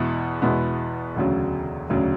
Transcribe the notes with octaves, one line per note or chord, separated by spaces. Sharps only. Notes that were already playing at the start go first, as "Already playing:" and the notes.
Already playing: E2 B2 G#3 B3 E4
E2 B2 G#3 B3 E4
E1 D2 C#3 F#3
E1 D2 C#3 F#3